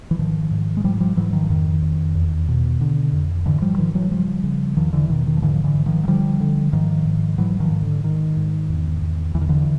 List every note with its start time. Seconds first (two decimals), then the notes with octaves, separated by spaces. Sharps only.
0.11 E3
0.19 G#2 D#3 F3
0.51 G#2
0.77 G#3
0.84 G#2 F3 G3
0.96 F#3
1.00 F3 G3
1.16 G#2 E3 F#3
1.33 D#3 F3
1.50 F2 D#3
1.82 F2
2.15 E2
2.48 B2
2.81 D3
3.13 F2
3.46 G#2 D3 E3
3.62 F3 G3
3.78 G#2 D#3 F3
3.95 E3 F#3
4.11 C#3 F3 G3
4.44 C#3
4.77 E2 D#3 F3
4.93 D3 E3
5.10 B2 D#3
5.26 D#3
5.37 F3
5.42 G#2 D3 E3
5.54 F3
5.64 D3 E3
5.75 G#2
5.86 D#3 F3
6.03 F#3
6.07 D3 F3 G3
6.40 D3
6.72 G#2 D#3 F3
7.05 G#2
7.38 G#2 E3 F#3
7.60 D#3 F3
7.71 G#2
7.82 D3
8.04 G#2 D#3
8.37 G#2
8.69 E2
9.02 E2
9.35 E2 E3
9.41 D#3
9.49 D3 E3